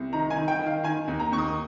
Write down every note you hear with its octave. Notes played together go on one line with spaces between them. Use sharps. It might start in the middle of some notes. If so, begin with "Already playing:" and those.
Already playing: C2
D#3 A#5
G#5
D#3
G5
D#3
F5
D#3 G#5
D#2
A#5
D#2 C#6
D#6